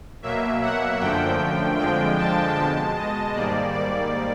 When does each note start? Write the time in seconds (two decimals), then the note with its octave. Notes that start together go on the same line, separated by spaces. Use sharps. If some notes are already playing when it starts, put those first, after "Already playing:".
0.22 B2 F#3 A#3 E5
0.62 F#5
1.00 F#2 D3 F3 A3 G5
1.79 F2 D3 F3 G#3 G5
2.17 A5
2.56 B2 G#3 A5
2.95 D#5
3.34 G#2 D#3 G3 A#3 D5
3.73 D5